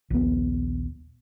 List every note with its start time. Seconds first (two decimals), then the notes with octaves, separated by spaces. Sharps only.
0.10 A#1 D#2 B3